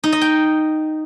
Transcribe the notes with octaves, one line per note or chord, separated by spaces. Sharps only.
D#4
D#5
G5